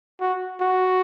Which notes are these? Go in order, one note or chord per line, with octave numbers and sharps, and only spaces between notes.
F#4
F#4